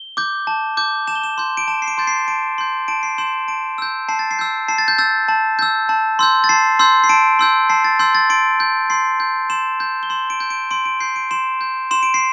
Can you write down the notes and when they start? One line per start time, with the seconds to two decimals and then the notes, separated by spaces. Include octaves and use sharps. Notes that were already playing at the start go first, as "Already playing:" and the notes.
Already playing: G7
0.17 D6 G6
0.47 A5
0.77 D6 G6
1.08 A5 E7
1.15 G7
1.24 E7
1.38 C6 G6
1.57 D7
1.68 A5 E7
1.82 C7
1.88 D7
1.98 C6 G6 A6
2.07 C7
2.28 A5 D7
2.58 C6 G6
2.88 A5 D7
3.03 C7
3.18 C6 G6 E7
3.48 A5 D7
3.78 E6 G6
4.09 A5 C7
4.19 A6
4.31 C7
4.39 E6 G6
4.68 A5 C7
4.78 A6
4.88 G6
4.98 E6 G6 A6
5.28 A5
5.59 E6 G6
5.89 A5
6.19 C6 E6 G6
6.44 A6
6.49 A5 C7
6.79 C6 E6 G6
7.04 C7
7.09 A5 D7
7.39 C6 E6 G6
7.70 A5 C7
7.84 A6
7.99 C6 E6 G6
8.15 A6
8.30 C6 D7
8.60 G6
8.90 C6 C7
9.20 G6
9.50 C6 E7
9.80 G6
10.03 G7
10.10 C6 E7
10.30 D7
10.40 G6
10.50 D7
10.71 C6 D7
10.86 D7
11.00 G6 C7
11.16 D7
11.31 C6 E7
11.61 G6
11.91 C6 E7
12.03 D7
12.14 C7